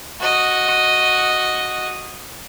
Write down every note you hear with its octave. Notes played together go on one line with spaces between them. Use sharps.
F#4 D#5